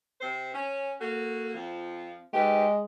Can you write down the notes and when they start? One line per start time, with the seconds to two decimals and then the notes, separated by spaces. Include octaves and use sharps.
0.21 C3 C5
0.54 C#4
1.00 A#3 F#4 A4
1.54 F2 F3
2.34 G#2 G#3 G4 B4